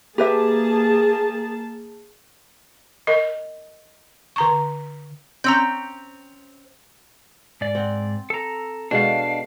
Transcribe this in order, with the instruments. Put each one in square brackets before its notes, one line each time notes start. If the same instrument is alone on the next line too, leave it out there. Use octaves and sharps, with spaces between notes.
[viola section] A#3 G#4 A5 [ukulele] G4 B4 E5
[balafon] A#4 D#5
D3 A#5 C#6
[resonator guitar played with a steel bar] C4 C#4 [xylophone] A#5 E6 G6
[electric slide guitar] G#2 D5
[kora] C4 F#5
[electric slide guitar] A4 A#5
[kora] B2 G#3 A4 [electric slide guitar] D4 F5